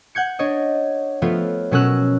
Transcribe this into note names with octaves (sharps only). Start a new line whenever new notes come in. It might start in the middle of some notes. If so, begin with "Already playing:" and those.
F#5 G6 G#6 C#7
D4 C#5 D#5
F3 A3 B3 F4 C#5
B2 F#3 C#4 A#4 E6 F#6